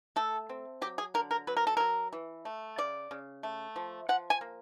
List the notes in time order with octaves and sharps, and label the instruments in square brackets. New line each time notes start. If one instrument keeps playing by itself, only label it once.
[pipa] A3 A4
C4
F#3 G4
G#4
D3 A#4
A#4
F#3 B4
A#4
A4
F#3 A#4
E3
A3
C#3 D5
C#3
A3
F3
F3 F#5
G#5
A#3